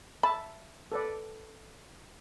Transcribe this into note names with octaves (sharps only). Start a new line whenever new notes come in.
E5 A5 B5
A4 B4 D5